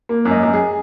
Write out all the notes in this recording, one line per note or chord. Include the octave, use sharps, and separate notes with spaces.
A#3
F#2
D#5
F#2
G#4